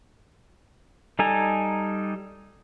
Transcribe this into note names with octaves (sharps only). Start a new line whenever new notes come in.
G3 D#4 A4 G#5 A#5